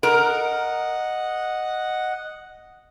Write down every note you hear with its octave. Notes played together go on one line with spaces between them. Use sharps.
A#4 D#5 F#5